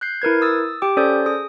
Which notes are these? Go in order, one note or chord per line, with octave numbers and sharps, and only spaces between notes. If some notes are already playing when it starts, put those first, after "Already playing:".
F#6 G6 C7
E4 A#4 B4 G#6
D#6 E6 A6
G4 G5 D6
C#4 A4 C5 D5 D#6 G6
G#4 D#6